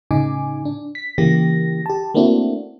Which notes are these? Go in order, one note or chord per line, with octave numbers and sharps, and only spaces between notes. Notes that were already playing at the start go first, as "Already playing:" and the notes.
A2 C#3 D#4 G#5 D6
D4
B6
C#3 E3 A#3 G4 A#6
G4 A5
A3 A#3 C4 D4 E4 F#4